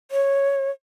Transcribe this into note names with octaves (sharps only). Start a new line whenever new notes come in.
C#5